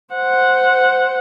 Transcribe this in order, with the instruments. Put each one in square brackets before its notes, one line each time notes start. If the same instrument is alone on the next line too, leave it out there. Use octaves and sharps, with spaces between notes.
[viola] C5 F#5